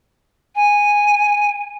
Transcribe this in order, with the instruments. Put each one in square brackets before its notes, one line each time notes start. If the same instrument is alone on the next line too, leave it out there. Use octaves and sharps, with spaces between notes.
[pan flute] G#5